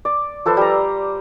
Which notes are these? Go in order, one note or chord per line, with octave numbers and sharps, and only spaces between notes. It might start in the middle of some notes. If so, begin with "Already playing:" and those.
D5
F3 A4 B4 C5
G3 A#5